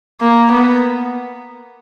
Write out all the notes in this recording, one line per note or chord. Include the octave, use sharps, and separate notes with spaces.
A#3
B3